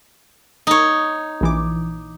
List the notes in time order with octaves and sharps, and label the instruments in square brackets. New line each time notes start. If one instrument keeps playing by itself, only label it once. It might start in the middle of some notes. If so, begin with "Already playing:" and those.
[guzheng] D#4 C#5
[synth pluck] A#1 E3 D6